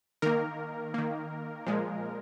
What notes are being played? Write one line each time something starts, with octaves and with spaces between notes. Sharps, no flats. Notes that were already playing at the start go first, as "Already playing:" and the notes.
D#3 A#3 A#4
D#3 A#3
A#2 F3 G#3